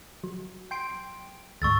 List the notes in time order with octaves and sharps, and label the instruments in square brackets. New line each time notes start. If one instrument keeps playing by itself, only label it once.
[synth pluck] F#3
G5 C6 D7
[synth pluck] D2 G#2 [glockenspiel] C#6 E6 A6